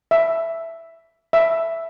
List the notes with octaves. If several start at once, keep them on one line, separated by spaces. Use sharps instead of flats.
E5
E5